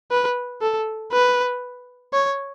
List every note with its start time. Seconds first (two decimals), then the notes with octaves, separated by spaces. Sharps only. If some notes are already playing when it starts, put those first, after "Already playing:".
0.11 B4
0.62 A4
1.12 B4
2.13 C#5